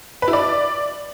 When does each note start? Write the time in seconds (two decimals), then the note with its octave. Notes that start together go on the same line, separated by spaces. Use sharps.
0.22 B4
0.28 E4
0.33 D5